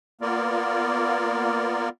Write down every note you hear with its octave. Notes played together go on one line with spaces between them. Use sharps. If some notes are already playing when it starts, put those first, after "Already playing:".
A#3 B3 F4 A#4 D5